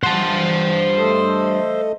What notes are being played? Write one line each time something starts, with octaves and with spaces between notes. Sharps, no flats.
G2 C5 F#5 A5
A3 A4 D#5